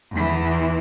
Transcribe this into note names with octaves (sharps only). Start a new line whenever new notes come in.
E2 E3